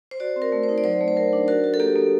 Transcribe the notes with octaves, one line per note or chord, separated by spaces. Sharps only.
C5
F#4 D5
C4
A#4
A3
C5
D#4
D5
F#3 C5
A3
C5
F#3 A#4
D4
F#4 A#4
F#4
A4
A#3 G4
A#3